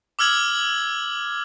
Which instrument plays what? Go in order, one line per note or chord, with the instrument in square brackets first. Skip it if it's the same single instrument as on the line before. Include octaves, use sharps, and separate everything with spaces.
[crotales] D6 E6 F6 G#6 F#7